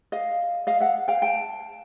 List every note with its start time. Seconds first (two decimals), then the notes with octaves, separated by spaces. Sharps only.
0.12 D#5 F5
0.67 D#5 F5
0.80 E5 F#5
1.08 F5 G5
1.22 G5 A5